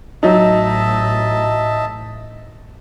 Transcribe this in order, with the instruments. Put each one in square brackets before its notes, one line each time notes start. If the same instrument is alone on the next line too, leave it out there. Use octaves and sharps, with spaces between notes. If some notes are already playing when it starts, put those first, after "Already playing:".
[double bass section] A1 [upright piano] F#3 D#4 [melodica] D#5 E5 A5